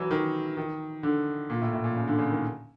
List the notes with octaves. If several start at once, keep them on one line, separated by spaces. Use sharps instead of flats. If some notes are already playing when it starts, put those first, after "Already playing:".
Already playing: E3 F#3
D#3
D#3
D3
A#2
A2
A2
A#2
C#3
D3
C#3
D#3